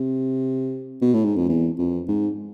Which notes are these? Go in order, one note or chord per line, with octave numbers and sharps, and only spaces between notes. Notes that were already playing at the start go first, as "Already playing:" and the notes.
Already playing: C3
B2
A2
G#2
F2
E2
F2
G#2